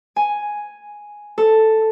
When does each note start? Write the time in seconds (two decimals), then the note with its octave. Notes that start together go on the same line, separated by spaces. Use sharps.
0.16 G#5
1.38 A4